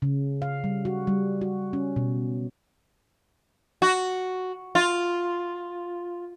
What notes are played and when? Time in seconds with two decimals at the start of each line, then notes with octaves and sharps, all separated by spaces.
0.02 C#3
0.42 F5
0.64 G3
0.85 F#4
1.07 G3
1.41 F#4
1.73 C#4
1.96 B2
3.82 F#4
4.75 F4